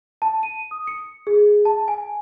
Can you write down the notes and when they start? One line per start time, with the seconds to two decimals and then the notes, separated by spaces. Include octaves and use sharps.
0.22 A5
0.43 D#7
0.71 D#6
0.87 C#7
1.27 G#4
1.65 A5
1.88 G#5